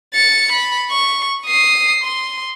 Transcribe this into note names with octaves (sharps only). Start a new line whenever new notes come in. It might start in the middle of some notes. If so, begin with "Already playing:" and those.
A6 C#7
B5
C#6
D#6 C7
C6